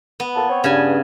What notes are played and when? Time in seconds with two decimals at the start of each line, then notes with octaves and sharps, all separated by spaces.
0.20 B3
0.35 A#2 A5
0.49 C4 C#5
0.64 G2 C#3 G#5